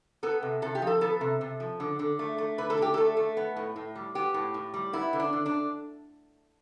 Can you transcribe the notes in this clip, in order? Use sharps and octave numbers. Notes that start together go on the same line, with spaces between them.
B3 A4
C3
C3 A4
G4
F3
A4
B3 A4
C3
C3
F3
D3
D3
A3
A3
D3 B4
A4
D3 G4
A3 A4
A3
B3
A2
A2
G3
B3 G4
A2
A2
G3
B3 E4
D3
D4
D3
D4